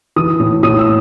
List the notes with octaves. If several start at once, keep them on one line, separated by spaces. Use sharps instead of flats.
E3 D#6
A2
A2 D#6
E6